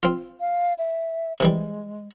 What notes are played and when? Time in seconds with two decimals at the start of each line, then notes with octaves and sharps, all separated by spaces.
0.03 C4 F4
0.40 F5
0.78 E5
1.40 C3 E3 G3 G#3